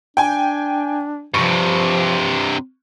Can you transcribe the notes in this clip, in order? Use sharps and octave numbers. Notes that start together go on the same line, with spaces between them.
D4 G5 G#5
G2 C3 F3 C#6